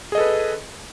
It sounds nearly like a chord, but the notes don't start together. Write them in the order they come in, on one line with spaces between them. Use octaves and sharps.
G#4 D#5 A4 B4